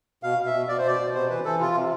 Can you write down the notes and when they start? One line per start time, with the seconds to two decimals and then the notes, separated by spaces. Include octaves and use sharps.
0.23 B2 F5
0.38 B2
0.46 E5
0.54 B2
0.68 B2 D5
0.78 C5
0.85 B2 D5
1.00 B2
1.15 C3 C5
1.30 E3 B4
1.45 E3 A4
1.60 C3 F4
1.75 C3